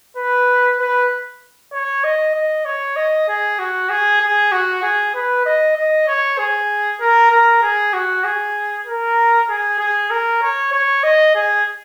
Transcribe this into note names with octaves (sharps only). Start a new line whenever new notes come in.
B4
B4
C#5
D#5
D#5
C#5
D#5
G#4
F#4
G#4
G#4
F#4
G#4
B4
D#5
D#5
C#5
G#4
A#4
A#4
G#4
F#4
G#4
A#4
G#4
G#4
A#4
C#5
C#5
D#5
G#4